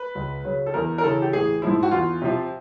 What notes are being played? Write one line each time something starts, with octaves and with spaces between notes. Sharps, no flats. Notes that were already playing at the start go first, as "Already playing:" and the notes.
Already playing: B4
C#2
C#3 F#3
A4
E2 A#4
A#4
C#3 E3 A4
G4
A1 G#4
G#2 F3 E4
F#4
E2 F4
C3 F3